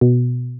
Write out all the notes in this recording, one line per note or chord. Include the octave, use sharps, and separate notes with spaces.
B2